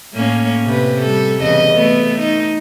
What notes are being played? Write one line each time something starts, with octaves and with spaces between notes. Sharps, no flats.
A2 A#3 C#4
C3 B4
G3 A4
E2 C#3 D#5
A3 B3
D#4